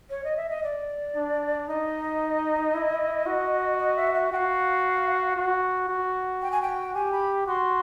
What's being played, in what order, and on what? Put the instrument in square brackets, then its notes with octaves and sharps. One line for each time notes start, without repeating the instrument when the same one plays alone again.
[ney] C#5
D#5
E5
D#5
D5
[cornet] D4
[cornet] D#4 [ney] D#5
[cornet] E4
F#4
[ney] D#5
E5
E5
[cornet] F#4 [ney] G5
[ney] F5
[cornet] F#4
F#4
[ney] G5
G#5
G5
[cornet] G4 [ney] G#5
[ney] B5
[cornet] F#4 [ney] C6